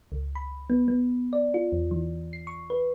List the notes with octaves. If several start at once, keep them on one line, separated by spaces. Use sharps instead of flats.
C#2
B5
B3
B3
D5
F4
E2
E3
C7
C#6
B4